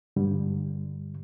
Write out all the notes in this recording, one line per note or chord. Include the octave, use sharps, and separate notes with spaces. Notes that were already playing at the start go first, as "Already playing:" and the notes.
G2 D3 G3